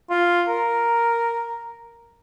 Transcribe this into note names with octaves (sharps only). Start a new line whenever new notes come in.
F4
A#4